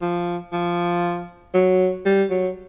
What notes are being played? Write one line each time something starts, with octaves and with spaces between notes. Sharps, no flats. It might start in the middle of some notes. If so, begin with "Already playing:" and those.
F3
F3
F#3
G3
F#3